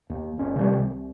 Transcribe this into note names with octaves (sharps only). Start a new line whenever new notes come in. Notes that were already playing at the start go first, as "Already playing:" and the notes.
D#2
G1 C#4
C3 D#3 F3 G3
C2